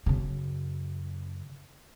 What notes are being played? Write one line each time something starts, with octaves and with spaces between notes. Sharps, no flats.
F#2 C#3